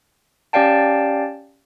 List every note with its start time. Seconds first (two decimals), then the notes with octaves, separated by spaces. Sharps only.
0.53 C#4 G4 D5 F5 G5 A5